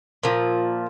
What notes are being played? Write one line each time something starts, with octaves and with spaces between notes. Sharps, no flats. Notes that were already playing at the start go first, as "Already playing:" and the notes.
A#2 F3